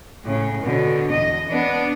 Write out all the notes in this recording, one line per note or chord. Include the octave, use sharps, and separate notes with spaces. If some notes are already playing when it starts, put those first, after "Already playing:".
A2 C#3
B2 D3
E2 D#5
B3 D4